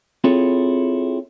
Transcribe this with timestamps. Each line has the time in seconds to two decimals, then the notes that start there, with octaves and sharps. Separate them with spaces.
0.24 C4 E4 F4 G#4 A4 C#5